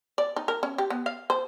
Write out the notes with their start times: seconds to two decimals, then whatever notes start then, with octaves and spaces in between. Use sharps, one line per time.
0.18 D5
0.36 D#4
0.48 A#4
0.63 C#4
0.78 G4
0.90 B3
1.06 F5
1.30 C5